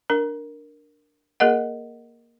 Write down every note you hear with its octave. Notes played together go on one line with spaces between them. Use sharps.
D4 A#4
A#3 G#4 A#4 D#5 F#5